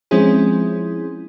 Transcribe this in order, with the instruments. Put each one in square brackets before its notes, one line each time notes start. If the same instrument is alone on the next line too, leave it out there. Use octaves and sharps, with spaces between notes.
[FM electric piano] F3 G#3 C4 C#4 E4 G#4